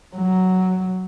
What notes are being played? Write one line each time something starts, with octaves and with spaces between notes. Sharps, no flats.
F#3